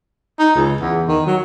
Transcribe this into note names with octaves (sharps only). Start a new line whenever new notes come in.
D#4
C#2
E2
D#3
F#3